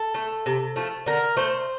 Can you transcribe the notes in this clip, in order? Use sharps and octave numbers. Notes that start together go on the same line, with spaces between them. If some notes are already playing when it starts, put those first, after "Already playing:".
Already playing: A4
A3
C3
F3 A3
D3 A#4
A3 C5